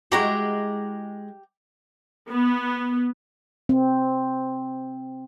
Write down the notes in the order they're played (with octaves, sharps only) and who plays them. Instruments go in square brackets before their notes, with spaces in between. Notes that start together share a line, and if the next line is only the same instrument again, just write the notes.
[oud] G#3 E4 F#4 [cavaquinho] G4 A#5
[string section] B3
[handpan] C4